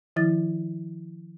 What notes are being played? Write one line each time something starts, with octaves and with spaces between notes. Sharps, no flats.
D#3 F3 E4 A6